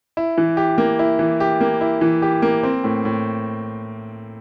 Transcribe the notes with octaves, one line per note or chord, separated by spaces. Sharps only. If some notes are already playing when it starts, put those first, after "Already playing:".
E4
E3
G4
A#3
E4
E3
G4
A#3
E4
E3
G4
A#3
C4
A2
A2